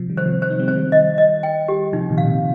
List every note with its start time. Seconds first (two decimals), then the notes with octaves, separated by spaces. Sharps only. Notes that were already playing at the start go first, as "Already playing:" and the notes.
Already playing: C3 F3
0.09 D#3 G3
0.17 C5
0.25 C3 F3
0.42 C5
0.50 D#4
0.59 G3 C4
0.68 C5
0.75 D#3 G3
0.92 D#5
1.18 D#5
1.43 G5
1.68 G4
1.93 C3 F3 D#4
2.10 A#2 D#3
2.18 F5
2.27 C3